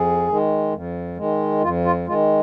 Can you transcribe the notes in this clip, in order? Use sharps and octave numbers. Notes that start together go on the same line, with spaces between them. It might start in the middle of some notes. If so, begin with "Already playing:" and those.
Already playing: F2 G#4
D#3 G#3
F2
D#3 G#3
F2 F4
F4
D#3 G#3 F4